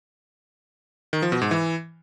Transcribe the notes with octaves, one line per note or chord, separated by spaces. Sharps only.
D#3
F3
B2
G#2
E3